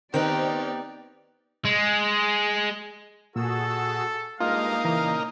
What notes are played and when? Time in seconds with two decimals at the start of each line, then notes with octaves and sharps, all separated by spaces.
0.14 D#3 B3 C4 D#4 G4 A#4 B4 D5
1.65 G#3
3.36 A#2 F#4 G#4 A4 E6
4.41 G2 G#3 A#3 D#4 F4 F5
4.85 A#2 C#3 E3 A#5